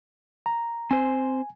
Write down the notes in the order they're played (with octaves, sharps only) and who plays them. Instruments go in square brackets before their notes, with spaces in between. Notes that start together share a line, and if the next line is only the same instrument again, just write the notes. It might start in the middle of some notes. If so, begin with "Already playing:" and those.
[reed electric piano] A#5
[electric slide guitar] C4 C5 [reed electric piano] G#5